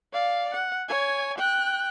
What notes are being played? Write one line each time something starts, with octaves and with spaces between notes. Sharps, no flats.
D5 F5
F#5
C#5 G#5
G5 F#6